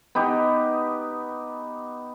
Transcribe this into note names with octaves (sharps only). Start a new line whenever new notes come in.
B3 D#4 G4